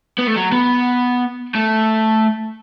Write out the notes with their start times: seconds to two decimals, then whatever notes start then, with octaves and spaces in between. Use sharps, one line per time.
0.19 B3
0.27 A3
0.36 F#3
0.52 B3
1.55 A3